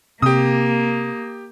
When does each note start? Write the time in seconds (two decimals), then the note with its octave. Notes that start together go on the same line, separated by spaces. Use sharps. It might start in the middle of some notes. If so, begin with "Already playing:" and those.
0.22 C3 A#3 G4 D#6